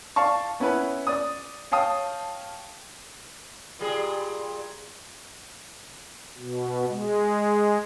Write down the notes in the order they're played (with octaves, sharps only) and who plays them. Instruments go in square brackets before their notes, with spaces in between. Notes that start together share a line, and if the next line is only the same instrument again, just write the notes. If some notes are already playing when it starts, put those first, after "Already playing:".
[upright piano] D5 F5 A5 C#6
B3 C#4 E4 B4
D5 D#6
C#5 F5 G5 A5 D#6
[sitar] A#2 G3 G#4
[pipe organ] B2
G#3